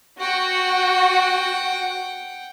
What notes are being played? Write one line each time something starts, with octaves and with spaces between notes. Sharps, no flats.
F#4 F#5 G5